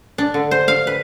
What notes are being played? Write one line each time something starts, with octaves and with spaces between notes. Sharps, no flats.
D4
D3
C5
F5
B4